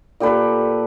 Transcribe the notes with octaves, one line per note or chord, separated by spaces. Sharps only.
A#2 G4 A4 B4